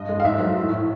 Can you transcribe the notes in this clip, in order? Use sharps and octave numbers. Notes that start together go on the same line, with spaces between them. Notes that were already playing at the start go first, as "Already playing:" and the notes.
Already playing: G2 D#5
G#3
F5
G#2 E5
F#3
A2
A2